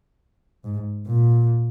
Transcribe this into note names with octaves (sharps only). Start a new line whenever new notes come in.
G#2
A#2